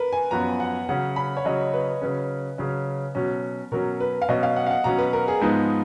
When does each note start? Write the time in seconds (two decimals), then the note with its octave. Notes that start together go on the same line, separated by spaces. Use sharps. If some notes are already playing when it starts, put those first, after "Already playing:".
Already playing: A#4 B4
0.13 G#5
0.31 F#2 F3 B3 F#4 A#5
0.60 F#5
0.89 C#3 F#3 C#4 F#5
1.16 B5
1.37 C#5
1.45 C#3 F#3 C#4 D#5
1.74 B4
2.01 C#3 F#3 C#4 B4
2.58 C#3 F#3 C#4
3.15 B2 F#3 C#4
3.72 B2 F#3 C#4 A#4
4.00 B4
4.22 F5
4.29 B2 F#3 C#4 D#5
4.43 F5
4.56 F#5
4.66 F5
4.71 F#5
4.84 B2 F#3 C#4 A#5
4.98 B4
5.13 A#4
5.28 G#4
5.41 G#2 F3 G#3 B3 D#4 B4